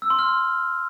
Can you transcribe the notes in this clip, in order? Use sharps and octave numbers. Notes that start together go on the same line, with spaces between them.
E6
C6
F6